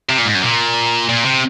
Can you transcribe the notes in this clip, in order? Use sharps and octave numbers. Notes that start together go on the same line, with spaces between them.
C3
A#2
G#2
F#2
A#2
A#2
C3